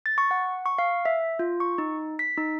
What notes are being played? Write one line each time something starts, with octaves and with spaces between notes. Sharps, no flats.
A6
C#6
F#5
C#6
F5
E5
F4
C#6
D#4
B6
D#4